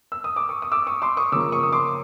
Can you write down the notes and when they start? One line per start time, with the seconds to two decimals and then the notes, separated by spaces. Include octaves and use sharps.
0.12 E6
0.24 D#6
0.36 D6
0.49 C#6 D#6
0.62 D#6
0.72 D6 E6
0.87 C#6 D#6
1.02 C6 D6
1.17 C#6 D#6
1.32 C#3 F3 A#3 D6 E6
1.52 C#6 D#6
1.63 D#6
1.72 C6 D6